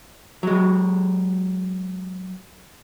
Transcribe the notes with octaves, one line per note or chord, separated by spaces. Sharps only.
F#3 G#3